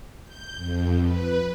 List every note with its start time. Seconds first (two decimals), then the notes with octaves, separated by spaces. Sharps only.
0.24 G6
0.56 F2
1.01 B4